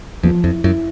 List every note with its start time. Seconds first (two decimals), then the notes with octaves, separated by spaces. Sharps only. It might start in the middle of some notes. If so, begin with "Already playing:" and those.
0.23 E2 F3
0.43 F2 E4
0.64 F#2 E4